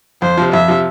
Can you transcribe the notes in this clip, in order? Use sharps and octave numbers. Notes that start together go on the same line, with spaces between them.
F2 C5
C3 F3
F2 E5
C3 F3